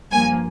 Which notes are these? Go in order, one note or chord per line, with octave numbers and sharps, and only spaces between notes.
G2 F3 A#3 G#5